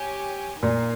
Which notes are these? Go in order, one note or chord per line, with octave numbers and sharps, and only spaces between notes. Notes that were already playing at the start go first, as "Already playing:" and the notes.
Already playing: G4 C#5 G#5
A#2 A#3 D#4 A#4 F5 G#5